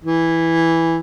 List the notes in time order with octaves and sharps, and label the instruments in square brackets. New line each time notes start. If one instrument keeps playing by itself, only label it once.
[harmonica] E3